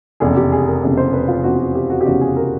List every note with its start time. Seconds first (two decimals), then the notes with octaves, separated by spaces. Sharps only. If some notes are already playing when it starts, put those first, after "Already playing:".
0.20 F1 E2 C#3 G#4
0.36 G4
0.52 G#4
0.68 A#4
0.82 F1 E2 C#3
0.97 C5
1.13 B4
1.28 F4
1.44 F1 E2 C#3 F#4
1.59 F#4
1.75 G4
1.90 F#4
2.01 G4
2.06 F1 E2 C#3 F#4
2.21 G#4
2.36 A#4